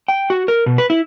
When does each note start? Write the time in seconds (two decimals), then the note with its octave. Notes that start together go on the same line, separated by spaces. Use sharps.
0.08 G5
0.30 F#4
0.48 A#4
0.66 B2
0.78 B4
0.90 E4